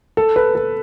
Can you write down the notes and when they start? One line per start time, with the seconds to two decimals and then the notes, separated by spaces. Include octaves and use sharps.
0.17 A4
0.36 B4
0.55 A4